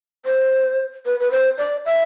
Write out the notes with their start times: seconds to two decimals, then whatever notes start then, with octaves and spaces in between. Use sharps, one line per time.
0.25 C5
1.06 B4
1.20 B4
1.31 C5
1.58 D5
1.85 E5